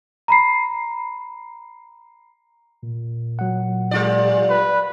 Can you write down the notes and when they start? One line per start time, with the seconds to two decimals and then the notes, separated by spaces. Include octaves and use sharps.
0.28 A#5 B5 C7
2.83 A#2
3.39 F#3 F#5
3.91 G3 F4 D5
4.50 B4